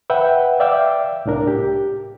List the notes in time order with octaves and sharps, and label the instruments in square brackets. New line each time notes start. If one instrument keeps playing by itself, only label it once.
[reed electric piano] B4 E5 F#5 G5
D5 E5 F5 G5 D6 E6
C2 A2 D4 A#4
G4